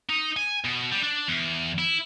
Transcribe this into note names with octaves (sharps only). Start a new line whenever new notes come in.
D#4
G#5
B2
G3
D4
E2
E4